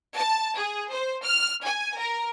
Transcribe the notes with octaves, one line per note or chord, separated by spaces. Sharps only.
A5
G#4
C5
F6
G#5
A#4